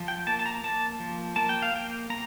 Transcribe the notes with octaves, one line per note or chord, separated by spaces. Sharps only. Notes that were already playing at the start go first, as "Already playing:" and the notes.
Already playing: F3
G5
A#3 A5
A5
A#5
A#3 A5
F3
A#3 A5
G5
F5
A#3 G5
A#3 A#5